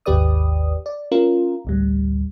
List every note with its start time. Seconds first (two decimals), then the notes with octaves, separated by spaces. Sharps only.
0.06 G#1 D#2 G4 B4 D5 D#6
0.86 D5
1.12 C#4 F4 A#4
1.65 A1 D2 G3